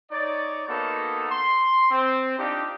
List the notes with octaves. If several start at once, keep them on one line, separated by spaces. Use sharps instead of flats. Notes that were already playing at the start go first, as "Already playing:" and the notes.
D#4 C#5 D5
A#3 B3 D#4 F#4 A4
C6
C4
D4 D#4 F4 G4